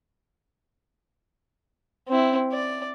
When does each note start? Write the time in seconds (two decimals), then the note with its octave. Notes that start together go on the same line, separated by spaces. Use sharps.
2.09 C4 E4
2.52 D5